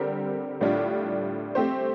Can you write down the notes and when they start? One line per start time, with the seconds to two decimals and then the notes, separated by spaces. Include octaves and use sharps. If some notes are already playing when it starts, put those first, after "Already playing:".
Already playing: D3 G3 C4 G4 A#4
0.61 A2 G3 D4 F4
1.55 A3 C4 G4 C5